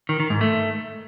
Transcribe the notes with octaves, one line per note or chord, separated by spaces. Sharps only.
D#3
D#3
G#2
A3